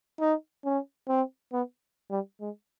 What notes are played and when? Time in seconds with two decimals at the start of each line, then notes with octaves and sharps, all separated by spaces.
0.20 D#4
0.65 C#4
1.08 C4
1.53 B3
2.10 G3
2.41 G#3